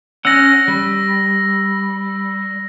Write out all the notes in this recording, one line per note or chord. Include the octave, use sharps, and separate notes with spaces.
C#4 F#5 E6 A#6
G3